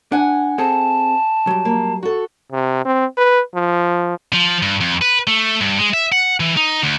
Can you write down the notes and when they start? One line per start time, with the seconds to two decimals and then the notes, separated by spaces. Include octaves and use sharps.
0.12 D4 F#5 G#5
0.58 C4 G#4 A4 A5
1.47 F#3 G3
1.65 A#3
2.03 F#4 A4
2.52 C3
2.85 C4
3.17 B4
3.55 F3
4.33 F3
4.62 G2
4.81 F2
5.01 B4
5.27 A3
5.61 G2
5.79 G#3
5.94 E5
6.12 F#5
6.40 E3
6.57 D#4
6.83 D2